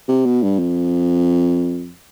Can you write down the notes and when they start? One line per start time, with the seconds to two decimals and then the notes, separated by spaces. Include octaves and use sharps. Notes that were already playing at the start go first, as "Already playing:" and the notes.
0.08 C3
0.26 B2
0.42 G2
0.59 F2